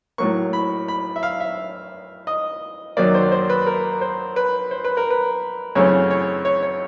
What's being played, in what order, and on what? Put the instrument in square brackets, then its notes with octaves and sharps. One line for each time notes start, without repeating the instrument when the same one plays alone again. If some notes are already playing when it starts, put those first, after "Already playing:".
[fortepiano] A2 F#3 A#3 C#6
B5
B5
E5
F5
E5
D#5
F#2 D#3 F#3 A#3 D5
C5
C5
B4
A#4
C5
B4
C5
B4
A#4
B4
F#2 C#3 E3 A3 C4 C#5
C#5
C#5
C#5